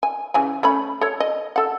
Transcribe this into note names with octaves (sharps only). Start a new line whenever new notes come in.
G#5
C#3 E3 G#5
A3 C#4 B5
A4 C#5
D#5
A4 F#5